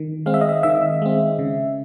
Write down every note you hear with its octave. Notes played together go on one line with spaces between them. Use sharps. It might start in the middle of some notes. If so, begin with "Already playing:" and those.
Already playing: D#3
G#3 C4 F5
E5
D#5
E5
D#3 E5
G#3 C4
C#3